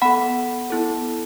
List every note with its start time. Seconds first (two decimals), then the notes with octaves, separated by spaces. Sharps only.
0.02 B3 A4 F#5 B5
0.70 B3 E4 A4